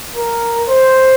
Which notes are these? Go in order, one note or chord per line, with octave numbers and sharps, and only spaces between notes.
A#4
C5